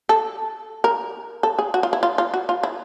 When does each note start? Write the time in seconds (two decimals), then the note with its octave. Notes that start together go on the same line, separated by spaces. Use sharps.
0.09 A4
0.84 A#4
1.43 A4
1.59 G#4
1.74 F#4
1.83 F4
1.93 E4
2.03 F4
2.18 F4
2.34 F#4
2.49 F4
2.63 E4